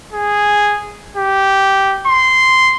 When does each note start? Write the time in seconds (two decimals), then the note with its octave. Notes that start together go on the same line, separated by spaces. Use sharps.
0.13 G#4
1.17 G4
2.07 C6